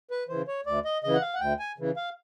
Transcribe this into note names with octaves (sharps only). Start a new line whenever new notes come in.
B4
C#3 E3 C5
C#5
D2 D5
D#5
C#3 E3 D#5
F#5
F5
F#5
D2 G5
G#5
C#3 E3
F5